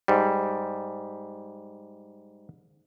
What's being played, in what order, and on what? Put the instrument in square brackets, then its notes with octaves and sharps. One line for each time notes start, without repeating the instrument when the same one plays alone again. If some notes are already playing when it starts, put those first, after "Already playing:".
[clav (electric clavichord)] G#2 G3